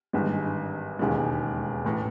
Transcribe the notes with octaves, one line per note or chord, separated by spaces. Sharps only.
G#1 G2 E3 G#3
E1 D#2 C#3 E3 G#3
A1 A2 E3